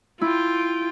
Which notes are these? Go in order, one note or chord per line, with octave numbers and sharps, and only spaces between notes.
E4 F4 G5